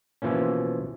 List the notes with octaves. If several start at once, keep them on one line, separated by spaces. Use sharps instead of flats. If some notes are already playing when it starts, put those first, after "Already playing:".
B2 E3 F3 A#3 C#4